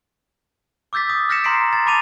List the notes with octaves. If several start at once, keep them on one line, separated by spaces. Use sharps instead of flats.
D6 E6 G6 A6 B6
D#6
F6 G6 A#6 B6 C#7 E7
A#5 C6 B6 C7 D7
A#5 A6
A5 B5 D6 A6 D#7 F7